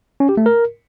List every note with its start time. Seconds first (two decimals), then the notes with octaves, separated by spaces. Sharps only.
0.20 C#4
0.29 G4
0.37 A3
0.46 A#4